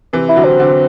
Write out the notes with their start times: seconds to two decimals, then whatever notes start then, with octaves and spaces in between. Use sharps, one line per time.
0.13 C3 E3
0.29 E4
0.36 D3 F#3
0.45 C4
0.60 D3